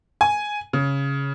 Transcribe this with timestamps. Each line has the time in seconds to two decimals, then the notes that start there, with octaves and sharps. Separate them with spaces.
0.21 G#5
0.73 C#3